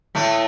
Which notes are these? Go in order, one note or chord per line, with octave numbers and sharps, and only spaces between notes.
A2 A3